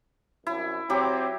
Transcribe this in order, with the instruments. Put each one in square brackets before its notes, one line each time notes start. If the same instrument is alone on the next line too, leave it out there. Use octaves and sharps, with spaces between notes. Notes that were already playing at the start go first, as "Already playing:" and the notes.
[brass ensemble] C2 F#2 [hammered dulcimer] E4
[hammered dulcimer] F#3 G4 D6 [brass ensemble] C4